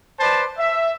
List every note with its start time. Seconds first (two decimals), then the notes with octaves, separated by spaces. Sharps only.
0.19 B4 C5 D5 A5
0.58 E5